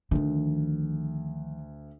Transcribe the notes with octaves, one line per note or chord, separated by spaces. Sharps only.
D2 D#3 F3